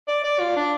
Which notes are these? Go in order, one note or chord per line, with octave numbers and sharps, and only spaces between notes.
D5
D5
F4
D4